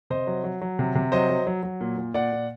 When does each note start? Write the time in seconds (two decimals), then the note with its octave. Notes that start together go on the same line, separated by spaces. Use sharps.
0.10 C3 C5 D#5
0.27 F#3
0.44 F#3
0.61 F#3
0.79 C3
0.95 C3
1.12 F#3 C5 D#5
1.29 F#3
1.47 F#3
1.63 F#3
1.81 A#2
1.97 A#2
2.14 A#2 D5 F#5
2.32 A#2